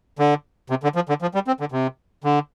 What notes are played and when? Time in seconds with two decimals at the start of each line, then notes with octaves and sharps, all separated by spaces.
0.19 D3
0.70 C3
0.83 D3
0.95 F3
1.09 D3
1.22 F3
1.34 G3
1.47 C4
1.60 D3
1.72 C3
2.24 D3